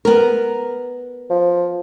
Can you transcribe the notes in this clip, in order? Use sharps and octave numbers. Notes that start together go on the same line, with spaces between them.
B3 A#4
F3